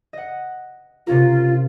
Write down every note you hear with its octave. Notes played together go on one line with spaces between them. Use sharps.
D#5 F#5
C3 C#4 F4 A#4